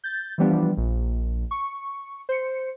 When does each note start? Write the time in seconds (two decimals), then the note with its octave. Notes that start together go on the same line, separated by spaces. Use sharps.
0.04 G6 A6
0.38 E3 F3 G3 B3 D4
0.77 A#1
1.51 C#6
2.29 C5 C#7